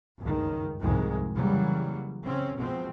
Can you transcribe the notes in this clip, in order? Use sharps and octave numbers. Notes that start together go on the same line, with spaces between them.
F#1 C#2 G2 D#3
C2 F2 G#2 C3 D#3 G#3
C#3 E3 F#3 G3 A#3
C#3 C4 C#4
B2 F3 G#3 C4